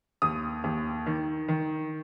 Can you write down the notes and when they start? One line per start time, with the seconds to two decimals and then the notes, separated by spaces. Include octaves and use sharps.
0.22 D#2 D#6
0.64 D#2
1.06 D#3
1.48 D#3